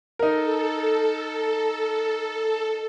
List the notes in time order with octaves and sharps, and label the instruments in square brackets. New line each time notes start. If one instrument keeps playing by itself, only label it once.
[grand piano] D#4 A#4 [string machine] A4